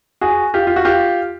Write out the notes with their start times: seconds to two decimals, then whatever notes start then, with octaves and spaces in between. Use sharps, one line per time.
0.21 F#4 G#4
0.54 F4 G4
0.67 F4
0.76 F#4
0.85 F4 G4